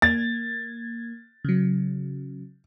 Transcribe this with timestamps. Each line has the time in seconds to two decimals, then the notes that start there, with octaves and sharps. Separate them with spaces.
0.02 A#3 G#6 A6
1.45 C#3 F#3